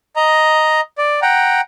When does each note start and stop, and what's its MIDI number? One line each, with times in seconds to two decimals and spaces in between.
0.16 0.81 75
0.16 0.81 82
0.98 1.20 74
1.22 1.61 78
1.22 1.61 79
1.22 1.61 82